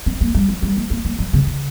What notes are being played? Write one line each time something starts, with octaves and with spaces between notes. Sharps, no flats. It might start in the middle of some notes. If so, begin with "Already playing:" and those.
C#4
A#3
G3
F#3
G3
A#3
A#3
A#3
F#3
C#3
C#3